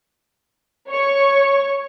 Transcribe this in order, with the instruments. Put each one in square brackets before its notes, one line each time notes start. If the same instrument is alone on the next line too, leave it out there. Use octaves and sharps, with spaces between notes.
[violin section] C#5 C#6